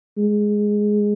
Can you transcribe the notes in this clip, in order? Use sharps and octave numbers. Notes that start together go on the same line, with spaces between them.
G#3